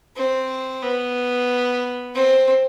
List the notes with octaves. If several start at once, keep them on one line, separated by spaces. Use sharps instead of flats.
C4
B3
C4